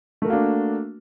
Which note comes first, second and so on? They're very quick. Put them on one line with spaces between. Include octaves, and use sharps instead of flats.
A3 A#4 F#4 A#3 D4